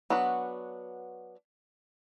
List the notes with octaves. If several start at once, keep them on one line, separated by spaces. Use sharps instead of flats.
F#3 B3 D4 F#4 B4